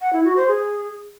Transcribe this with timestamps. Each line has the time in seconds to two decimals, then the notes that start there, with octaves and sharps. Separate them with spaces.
0.01 F#5
0.13 E4
0.25 F#4
0.36 C5
0.48 G#4